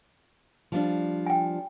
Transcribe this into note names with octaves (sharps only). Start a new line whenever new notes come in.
F3 G3 D4
G5 G#5